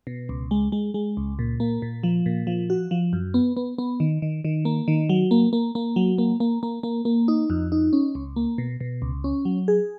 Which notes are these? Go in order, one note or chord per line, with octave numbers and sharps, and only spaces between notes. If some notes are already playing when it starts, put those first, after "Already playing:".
B2
C#2
G#3
G#3
G#3
C#2
A#2
A#3
A#2
F3
A#2
F3
F#4
F3
F#2
B3
B3
B3
D#3
D#3
D#3
A#3
D#3
F#3
A#3
A#3
A#3
F#3
A#3
A#3
A#3
A#3
A#3
D#4
F2
D#4
C#4
C#2
A#3
B2
B2
C#2
C#4
F#3
G#4